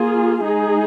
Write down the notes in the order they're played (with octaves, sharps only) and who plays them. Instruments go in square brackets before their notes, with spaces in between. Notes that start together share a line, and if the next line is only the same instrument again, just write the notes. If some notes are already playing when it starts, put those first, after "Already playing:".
Already playing: [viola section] A#3 F4 G#4
G#3 D#4 G#4